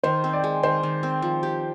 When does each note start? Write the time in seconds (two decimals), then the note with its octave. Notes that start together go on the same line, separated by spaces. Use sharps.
0.04 D#3 C5
0.24 C4
0.33 D5
0.44 G#3
0.63 D#3 C5
0.83 D#3
1.03 C4
1.22 F3
1.43 G4